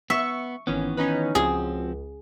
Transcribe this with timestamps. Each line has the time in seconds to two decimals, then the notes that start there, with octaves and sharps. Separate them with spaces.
0.10 B3 E5 C#6
0.67 G#1 D#3 E3 B3 C#4
0.97 C#4 D#4 B4
1.35 C#2 F3 C4 F#4 G#4